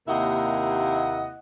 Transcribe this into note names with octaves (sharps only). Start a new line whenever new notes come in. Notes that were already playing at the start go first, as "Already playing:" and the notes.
D#2 C3 A#3 E4 D#5 F#5